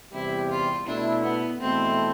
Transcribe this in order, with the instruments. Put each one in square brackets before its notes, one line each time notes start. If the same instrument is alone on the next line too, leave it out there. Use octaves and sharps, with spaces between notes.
[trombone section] E2 C3 G3 C4 G4 [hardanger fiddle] E4
[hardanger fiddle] F4
[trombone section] B2 A3 E4 [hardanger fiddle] D4
[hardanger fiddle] B3
[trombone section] E2 B2 A3 E4 [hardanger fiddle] C4